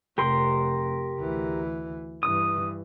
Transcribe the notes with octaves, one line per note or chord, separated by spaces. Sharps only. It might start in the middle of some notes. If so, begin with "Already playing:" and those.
F1 F2 G4 A#4 C6
D2 E3
G2 E3 D#6